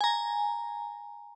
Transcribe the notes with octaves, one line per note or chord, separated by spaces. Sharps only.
G#5 A#5